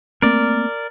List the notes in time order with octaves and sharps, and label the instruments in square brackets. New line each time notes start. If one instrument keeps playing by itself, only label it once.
[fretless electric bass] A3 A#3 C4 [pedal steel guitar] A#4 D5